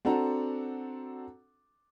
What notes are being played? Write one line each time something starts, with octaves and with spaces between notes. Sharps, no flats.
C4 D4 F#4 A4 F#5 A#5